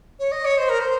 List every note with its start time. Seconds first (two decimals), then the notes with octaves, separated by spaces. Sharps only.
0.19 C#5
0.32 D#5
0.45 C#5
0.58 C5
0.69 A#4
0.80 C5